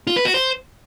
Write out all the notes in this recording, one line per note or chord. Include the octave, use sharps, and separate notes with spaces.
F4
B4
F#4
C5